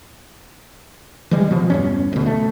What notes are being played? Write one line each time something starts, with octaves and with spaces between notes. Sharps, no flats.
E3 G3 G#3
B2 F3
E2 G2 C#4
D2 B2
A3